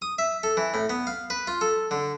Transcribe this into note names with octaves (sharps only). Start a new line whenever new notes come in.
D#6
E5
A4
E3
A2
B3
F5
B4
F4
A4
D3